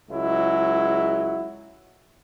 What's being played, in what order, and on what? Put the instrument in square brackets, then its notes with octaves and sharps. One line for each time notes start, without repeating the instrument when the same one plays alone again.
[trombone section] C#2 F#3 G#3 E4